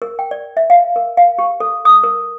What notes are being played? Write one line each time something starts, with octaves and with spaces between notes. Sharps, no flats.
A#4
G5
D5
E5
F5
A#4
F5
G4
A4
D#6
A#4